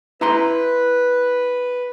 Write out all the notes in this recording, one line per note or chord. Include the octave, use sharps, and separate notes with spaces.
E4 B4 A#5 C6